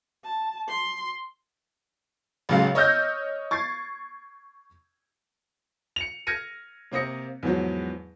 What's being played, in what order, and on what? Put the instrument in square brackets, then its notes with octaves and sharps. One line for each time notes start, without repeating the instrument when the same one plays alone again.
[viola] A5
C6
[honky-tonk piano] A1 C#3 F#3 G#3 F5
C#5 D#5 E6 F6 G6 A#6
C#6 G#6 A6 C7
[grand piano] C#7 F7
F6 G#6 A#6 C#7 D#7
C3 A#3 C4 D#6 A#6 C#7
E2 G#2 F3 F#3